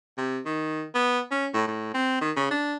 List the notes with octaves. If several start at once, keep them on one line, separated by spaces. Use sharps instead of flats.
C3
D#3
B3
C#4
A2
A2
C4
D#3
C#3
D4